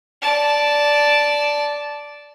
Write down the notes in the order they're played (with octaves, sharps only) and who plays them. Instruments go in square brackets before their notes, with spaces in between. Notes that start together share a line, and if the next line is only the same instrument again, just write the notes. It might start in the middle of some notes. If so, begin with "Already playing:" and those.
[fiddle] D5 A5